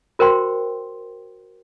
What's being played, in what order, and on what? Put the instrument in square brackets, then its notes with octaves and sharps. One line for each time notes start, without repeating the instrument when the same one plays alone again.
[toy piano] F#4 A#4 C5 G5 C6